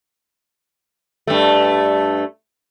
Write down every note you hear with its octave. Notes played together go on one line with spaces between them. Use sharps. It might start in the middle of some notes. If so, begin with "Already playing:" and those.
G2 A3